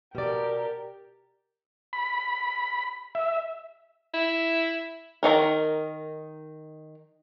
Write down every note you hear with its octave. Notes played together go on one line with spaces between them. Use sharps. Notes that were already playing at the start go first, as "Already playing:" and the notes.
B2 G4 A#4 D5
B5
E5
E4
D#3 F#3 D#4 A#4